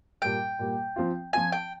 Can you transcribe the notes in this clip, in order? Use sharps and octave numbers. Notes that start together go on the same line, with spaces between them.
A#2 G3 A#3 G5
A#2 G3 A#3
F3 C4 F4
F3 C4 F4 G#5
G5